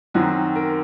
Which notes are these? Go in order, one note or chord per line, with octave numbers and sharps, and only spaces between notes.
F#2 D#3 F#3 C4 F#4
A#4